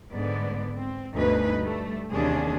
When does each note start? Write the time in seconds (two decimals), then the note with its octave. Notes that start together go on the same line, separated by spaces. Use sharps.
0.12 G#2 D3 B3 D5
0.74 C4
1.13 D2 G2 B2 D#4 B4
1.59 G3 A3
2.11 D#2 C3 E3 C#4 D4 G#4